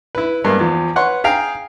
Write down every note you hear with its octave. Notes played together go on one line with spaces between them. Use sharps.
E4 B4
G2 G#3 A#3 B3
E2 F3
B4 C#5 F#5 C6 C#6
G#4 F5 G5 A#5